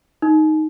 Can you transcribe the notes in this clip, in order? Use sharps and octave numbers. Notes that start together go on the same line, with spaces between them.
D#4